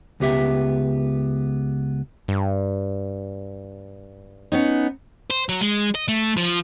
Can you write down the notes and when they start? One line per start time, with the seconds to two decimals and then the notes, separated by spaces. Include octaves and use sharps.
0.20 C#2 B3 G4 E5
2.28 G2
4.52 B3 C#4 D#4
5.30 C5
5.49 F#3
5.61 G#3
5.95 D#5
6.08 A3
6.37 F3